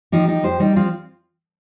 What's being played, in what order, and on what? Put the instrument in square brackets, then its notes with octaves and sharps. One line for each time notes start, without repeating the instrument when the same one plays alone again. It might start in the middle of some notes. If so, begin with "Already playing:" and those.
[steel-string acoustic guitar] F3 D#4 G4
F3 D#4 G4
F2 G4 C5
G3 D#4 G4
F3 C4 F4